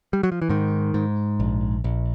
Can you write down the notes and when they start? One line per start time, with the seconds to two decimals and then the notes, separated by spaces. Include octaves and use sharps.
0.13 G3
0.23 F#3
0.32 F3
0.42 E3
0.49 G#2 D#3
0.94 G#2
1.40 A#1
1.84 A#1